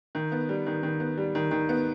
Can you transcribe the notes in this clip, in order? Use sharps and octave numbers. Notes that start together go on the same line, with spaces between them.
D#3
B3
G3
D#3
D#3
B3
G3
D#3
D#3
B3